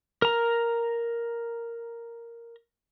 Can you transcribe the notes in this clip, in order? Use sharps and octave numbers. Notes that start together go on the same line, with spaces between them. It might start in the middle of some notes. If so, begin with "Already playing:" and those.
A#4 A#5